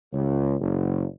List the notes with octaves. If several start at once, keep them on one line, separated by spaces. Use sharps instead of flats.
C#2
F#1